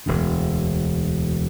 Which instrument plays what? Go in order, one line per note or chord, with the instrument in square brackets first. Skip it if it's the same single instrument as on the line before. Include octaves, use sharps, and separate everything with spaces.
[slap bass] E1 D2 D3